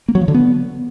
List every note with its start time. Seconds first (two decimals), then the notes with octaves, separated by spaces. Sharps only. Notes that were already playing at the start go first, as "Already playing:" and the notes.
0.08 A#3
0.15 F#3
0.21 F3
0.28 D3
0.34 B3